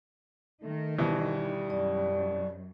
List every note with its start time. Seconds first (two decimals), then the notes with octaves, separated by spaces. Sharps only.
0.62 D#3 A3 D#4
0.98 G#1 B2 E3 G3
1.70 F#2 D5